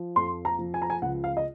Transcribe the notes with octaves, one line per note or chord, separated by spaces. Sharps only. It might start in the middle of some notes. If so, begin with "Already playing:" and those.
Already playing: F3
F2 C6
A#5
F3
G#5
A#5
G#5
C#2 F#5
F5
D#5